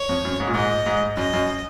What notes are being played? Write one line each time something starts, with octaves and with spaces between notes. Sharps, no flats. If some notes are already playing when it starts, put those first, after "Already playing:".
Already playing: C#5
F2
F#2
G#2
A#2
G#2 D#5
G#2
F#2 D#5
F#2